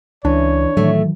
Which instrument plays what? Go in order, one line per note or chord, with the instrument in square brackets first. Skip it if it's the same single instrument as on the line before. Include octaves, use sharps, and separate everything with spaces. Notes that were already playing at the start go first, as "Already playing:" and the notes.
[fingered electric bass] C#2 C#4 [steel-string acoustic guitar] E3 [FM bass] D4 [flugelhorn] C#5
[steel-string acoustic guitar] A2 A3 [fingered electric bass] D#3 E3 F#3